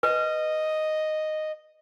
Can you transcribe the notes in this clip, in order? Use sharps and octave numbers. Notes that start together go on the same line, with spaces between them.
B4 D#5